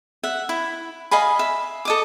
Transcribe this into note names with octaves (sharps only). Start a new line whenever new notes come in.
E5 F#5
E4
D#5 F5 G#5 B5
E5
A4 D#5 D6